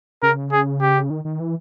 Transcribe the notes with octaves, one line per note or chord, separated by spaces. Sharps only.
C#3 A#4
G#4
G4
D#3
D#3
E3